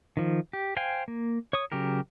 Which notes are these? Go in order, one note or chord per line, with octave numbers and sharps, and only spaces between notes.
D#3 F3
G4
C5 F5 G5 G#5
A#3
C#5 C#6 D#6
C#3 F#3 G4 A#4